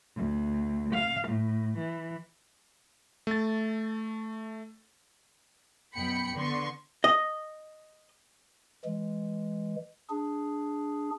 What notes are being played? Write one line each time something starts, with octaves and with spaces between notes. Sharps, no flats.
D2
F5
A2
E3
A3 A6
F#2 B2 G5 B5 C#7
D3 B3 C6 C#6
D#5
E3 G#3
D4 G#4